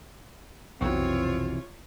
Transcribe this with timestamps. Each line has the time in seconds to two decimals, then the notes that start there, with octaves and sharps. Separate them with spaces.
0.81 B1 F2 C3 E3 C4 F4 F#4 C#5